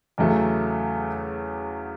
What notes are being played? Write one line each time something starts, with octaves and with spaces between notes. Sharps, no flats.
E2 C#3 F#3 A3